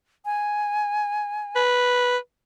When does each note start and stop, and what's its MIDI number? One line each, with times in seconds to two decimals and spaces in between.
0.25 1.61 80
1.56 2.17 71